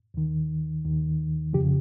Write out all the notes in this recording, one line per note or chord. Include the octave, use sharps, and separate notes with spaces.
D#2 D#3
D#2 D#3
F2 C#3 F3 G4